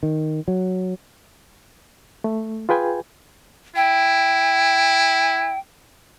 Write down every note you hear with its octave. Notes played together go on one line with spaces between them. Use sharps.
D#3
F#3
A3
F4 G#4 B4 G5 G#5
E4 G5